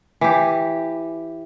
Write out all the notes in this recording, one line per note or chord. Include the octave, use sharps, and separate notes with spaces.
E3 G4